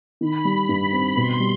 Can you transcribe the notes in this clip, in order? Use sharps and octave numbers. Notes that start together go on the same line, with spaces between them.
D#3 B5
G3
G2
C4
B2 C6
G3